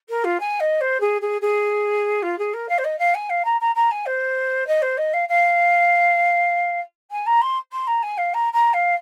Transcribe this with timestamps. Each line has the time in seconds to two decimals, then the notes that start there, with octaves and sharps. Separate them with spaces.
0.09 A#4
0.24 F4
0.40 G#5
0.60 D#5
0.80 C5
1.00 G#4
1.21 G#4
1.41 G#4
2.22 F4
2.38 G#4
2.53 A#4
2.68 F5
2.78 C5
2.84 D#5
2.98 F5
3.14 G#5
3.29 F5
3.44 A#5
3.60 A#5
3.75 A#5
3.91 G#5
4.06 C5
4.67 D#5
4.82 C5
4.97 D#5
5.13 F5
5.28 F5
7.11 G#5
7.26 A#5
7.41 C6
7.72 C6
7.87 A#5
8.02 G#5
8.17 F5
8.34 A#5
8.53 A#5
8.73 F5